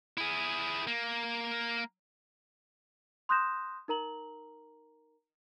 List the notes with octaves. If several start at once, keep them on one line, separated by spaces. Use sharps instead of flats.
E4 G#4
A#3
C6 D#6 F#6 G6 A#6 E7
D#4 A#4 A#5 F#7